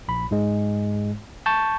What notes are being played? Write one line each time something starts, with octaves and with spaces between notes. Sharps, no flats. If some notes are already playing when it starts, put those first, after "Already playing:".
A#1 B5
G#2 G#3
A5 C#6 G6